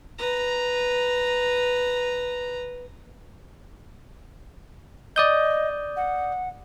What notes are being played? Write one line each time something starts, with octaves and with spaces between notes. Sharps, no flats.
B4 A#5
D5 D#5 D#6 G6
F#5